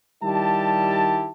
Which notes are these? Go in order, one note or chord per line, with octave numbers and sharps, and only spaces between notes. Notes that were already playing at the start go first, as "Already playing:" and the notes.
D#3 G3 E4 G4 A5